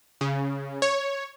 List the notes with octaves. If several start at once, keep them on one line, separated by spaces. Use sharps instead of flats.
C#3
C#5